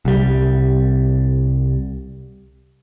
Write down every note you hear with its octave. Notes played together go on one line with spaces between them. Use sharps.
C2 G3